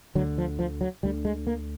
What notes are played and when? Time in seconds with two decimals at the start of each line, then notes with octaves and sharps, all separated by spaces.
0.15 D3 F#3
0.18 D2
0.38 F3
0.59 F3
0.81 F#3
1.03 D2 D3 G3
1.25 G#3
1.47 A#3